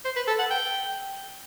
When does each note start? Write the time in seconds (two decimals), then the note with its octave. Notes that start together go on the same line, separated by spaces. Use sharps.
0.05 C5
0.16 B4
0.28 A4
0.39 F#5
0.50 G5